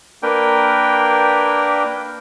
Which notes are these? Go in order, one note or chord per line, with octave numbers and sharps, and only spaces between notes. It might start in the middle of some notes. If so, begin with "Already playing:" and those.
A#3 D4 A#4 B4 G5